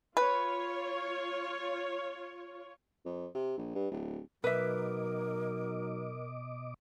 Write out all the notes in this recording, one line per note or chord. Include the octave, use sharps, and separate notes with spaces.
F4 B4 C#5
F2
C3
A#1
G2
D1
B2 F#3 D#4 A#4 B4 D#5 E5 D6